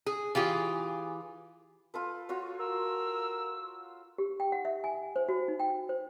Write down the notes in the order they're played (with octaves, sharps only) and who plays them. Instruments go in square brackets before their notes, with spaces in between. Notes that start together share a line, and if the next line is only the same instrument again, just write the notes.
[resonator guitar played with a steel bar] G#4
E3 F4 G4 G#4
[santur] F4 A4 B4
F4 F#4 C#5
[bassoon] A#4 [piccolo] E6
[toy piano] G4
G5
F#5
E5
G#5
C5
F#4
D#4
G5
C5